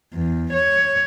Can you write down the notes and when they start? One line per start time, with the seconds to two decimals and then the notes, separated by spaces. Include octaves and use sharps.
0.13 E2
0.54 C#5